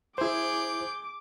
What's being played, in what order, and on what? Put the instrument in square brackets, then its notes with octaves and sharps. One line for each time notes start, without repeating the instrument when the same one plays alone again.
[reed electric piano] E4 C5 [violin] G#4 G6 [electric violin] D6